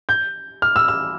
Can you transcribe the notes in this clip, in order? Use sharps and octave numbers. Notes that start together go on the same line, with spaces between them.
G6
F6
E6
E6